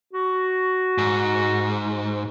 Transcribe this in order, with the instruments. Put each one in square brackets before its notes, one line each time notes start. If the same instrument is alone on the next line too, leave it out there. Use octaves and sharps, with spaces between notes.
[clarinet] F#4
[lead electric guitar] G#2